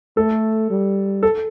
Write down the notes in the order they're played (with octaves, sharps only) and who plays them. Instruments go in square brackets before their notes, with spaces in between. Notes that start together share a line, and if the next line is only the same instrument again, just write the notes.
[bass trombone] A3 [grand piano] A4
[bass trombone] G3
[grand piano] A4